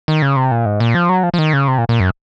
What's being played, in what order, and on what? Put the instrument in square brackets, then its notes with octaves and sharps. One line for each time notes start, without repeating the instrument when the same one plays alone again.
[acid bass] D#3
C#3
C3
A#2
G#2
A#2
F3
F#3
F3
F3
D#3
C#3
C3
A#2
A#2
F#2